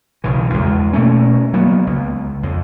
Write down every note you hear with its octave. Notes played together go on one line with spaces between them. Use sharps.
B1 C#3 E3
E2 G#3
B2 A3 A#3 C#4
F#3 A#3 B3
C#2
F2